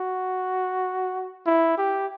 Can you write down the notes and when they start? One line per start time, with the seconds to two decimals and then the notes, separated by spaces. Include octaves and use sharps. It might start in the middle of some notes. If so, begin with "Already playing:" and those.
Already playing: F#4
1.46 E4
1.78 G4